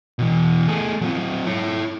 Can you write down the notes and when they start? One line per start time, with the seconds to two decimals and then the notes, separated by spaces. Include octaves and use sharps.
0.19 B2 E3
0.68 A3 G#4
1.01 F#3 C4
1.47 E4 C#5